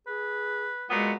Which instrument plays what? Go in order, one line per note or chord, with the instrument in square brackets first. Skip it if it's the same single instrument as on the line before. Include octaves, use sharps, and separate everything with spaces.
[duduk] G#4 [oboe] B4
[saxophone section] A#2 F#3 B3 [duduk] G#3